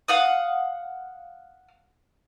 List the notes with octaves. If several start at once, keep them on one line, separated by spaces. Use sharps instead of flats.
F5 F#5 D#6